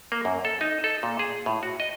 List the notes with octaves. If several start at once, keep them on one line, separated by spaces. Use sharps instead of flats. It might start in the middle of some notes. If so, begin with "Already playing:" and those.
A#3
F#2
A4
D#4
A4
A#2
G#4
A2
F#4
D#5